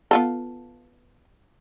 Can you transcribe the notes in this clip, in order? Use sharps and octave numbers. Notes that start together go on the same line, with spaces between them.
B3 F4 A4